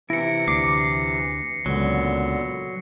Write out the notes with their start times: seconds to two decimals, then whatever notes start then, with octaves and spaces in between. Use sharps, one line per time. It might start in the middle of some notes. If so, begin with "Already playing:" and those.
0.10 C3 E3 E4 A#6 C#7
0.48 D2 D6 C7
1.66 C#2 A#2 D3 F#3 B3